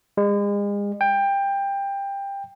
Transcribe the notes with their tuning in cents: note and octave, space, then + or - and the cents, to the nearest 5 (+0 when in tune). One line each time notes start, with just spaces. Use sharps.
G#3 -40
G5 +20